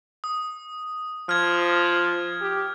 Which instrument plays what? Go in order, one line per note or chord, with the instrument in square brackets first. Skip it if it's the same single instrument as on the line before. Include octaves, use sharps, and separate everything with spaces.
[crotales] D#6
[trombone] F3 [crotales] F6 G#6
[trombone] G4